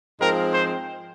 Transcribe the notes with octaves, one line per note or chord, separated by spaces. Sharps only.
G#2 F3 G#3 C4 A#4
C5